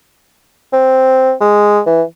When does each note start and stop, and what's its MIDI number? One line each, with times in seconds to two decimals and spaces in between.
0.73 1.33 60
1.41 1.80 56
1.86 2.03 52